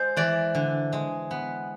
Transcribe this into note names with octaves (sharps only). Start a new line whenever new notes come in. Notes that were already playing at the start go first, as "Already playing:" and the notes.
Already playing: G#3 C5
E3 D5
D3
G#3
B3